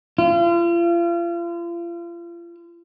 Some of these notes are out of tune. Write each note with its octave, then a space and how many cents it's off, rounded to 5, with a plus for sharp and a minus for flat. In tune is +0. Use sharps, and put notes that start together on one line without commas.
F4 -40